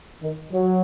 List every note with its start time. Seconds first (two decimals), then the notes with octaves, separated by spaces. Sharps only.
0.22 D#3
0.52 F#3